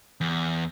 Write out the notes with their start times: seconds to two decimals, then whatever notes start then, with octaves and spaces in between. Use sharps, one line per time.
0.21 E2